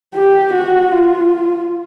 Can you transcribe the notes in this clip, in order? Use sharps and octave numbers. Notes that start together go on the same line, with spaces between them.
G4
F#4
F4